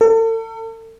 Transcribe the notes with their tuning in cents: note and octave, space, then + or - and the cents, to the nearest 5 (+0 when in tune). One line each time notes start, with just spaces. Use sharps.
A4 +40